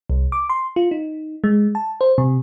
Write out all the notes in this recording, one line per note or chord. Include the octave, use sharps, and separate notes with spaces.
C2
D6
C6
F4
D#4
G#3
A5
C5
C3